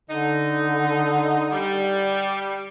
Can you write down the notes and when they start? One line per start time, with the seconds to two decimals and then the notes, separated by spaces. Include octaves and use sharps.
0.10 D3 D#4
1.52 G3